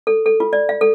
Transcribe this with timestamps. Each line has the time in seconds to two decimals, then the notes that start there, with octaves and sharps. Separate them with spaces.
0.07 A4
0.26 A4
0.40 F4
0.53 D5
0.69 F5
0.81 A4